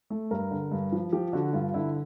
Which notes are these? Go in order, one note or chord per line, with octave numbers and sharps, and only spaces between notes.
A3
G2 A#4
D3
G2
F3
F3 G4
D3 F#4
G2 F4
D3 E4